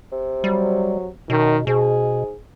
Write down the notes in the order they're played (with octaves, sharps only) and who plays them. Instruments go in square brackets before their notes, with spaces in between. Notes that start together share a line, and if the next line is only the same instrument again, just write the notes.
[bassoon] C3
[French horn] F#3 [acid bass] G3
[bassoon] F#2 [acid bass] B2 [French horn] D#3
[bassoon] G#2 [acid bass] B2 [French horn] G#4